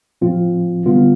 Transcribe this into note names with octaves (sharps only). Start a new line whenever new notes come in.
A2 F3 C4 F4
D3 G3 B3 F4